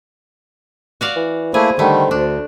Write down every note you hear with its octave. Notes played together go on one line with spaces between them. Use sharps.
F#4 D5 F5
E3
A3 A#3 E4 G#4 C5
D3 D#3 G3 A3
D2 D4